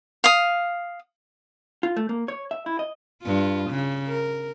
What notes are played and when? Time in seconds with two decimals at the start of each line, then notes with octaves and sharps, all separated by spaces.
0.24 F5 D#6
1.83 F4
1.96 A3
2.09 A#3
2.28 C#5
2.51 E5
2.66 E4
2.79 D#5
3.23 G2 F4
3.70 C#3
4.08 A#4